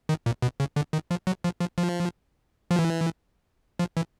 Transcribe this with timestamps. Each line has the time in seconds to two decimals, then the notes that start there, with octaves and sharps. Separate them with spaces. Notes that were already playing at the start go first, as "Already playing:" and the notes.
0.09 D#3
0.26 A#2
0.42 B2
0.60 C#3
0.76 D3
0.93 D#3
1.11 F3
1.27 F#3
1.44 F3
1.60 F3
1.78 F3
2.71 F3
2.79 E3
3.79 F3
3.97 E3